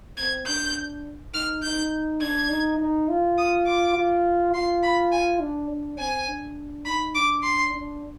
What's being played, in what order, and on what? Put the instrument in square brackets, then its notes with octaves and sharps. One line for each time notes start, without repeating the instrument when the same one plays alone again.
[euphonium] C4 [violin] G#6
[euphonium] D4 [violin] G6
[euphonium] D#4 [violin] F6
[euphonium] D#4 [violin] G6
[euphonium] D4 [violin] G#6
[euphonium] D#4
D#4
F4
[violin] D#6
D6
[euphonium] F4
[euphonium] F4 [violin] C6
[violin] B5
G#5
[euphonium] D4
D4
[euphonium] C4 [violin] G#5
[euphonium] D4
[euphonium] D#4 [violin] B5
[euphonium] D4 [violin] D6
[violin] C6
[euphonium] D4